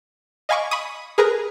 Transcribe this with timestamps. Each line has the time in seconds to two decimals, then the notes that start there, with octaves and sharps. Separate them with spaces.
0.49 D#5 F5 G#5 B5 C#6 D6
0.71 B5 C#6 D#6
1.18 G#4 A#4 B4 A#5